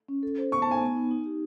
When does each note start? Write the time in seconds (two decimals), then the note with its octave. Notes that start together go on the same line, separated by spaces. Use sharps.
0.08 C#4
0.23 A4
0.38 C5
0.52 B3 C#6
0.62 A5
0.67 D#4 G#5
0.81 B3
0.97 D#4
1.11 D#4
1.26 G4